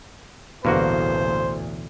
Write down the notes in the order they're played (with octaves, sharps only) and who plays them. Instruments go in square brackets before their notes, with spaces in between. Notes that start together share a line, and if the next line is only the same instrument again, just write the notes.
[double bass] A1 D2 [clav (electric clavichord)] G2 A#3 F#4 [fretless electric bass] B2 E3 [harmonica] C5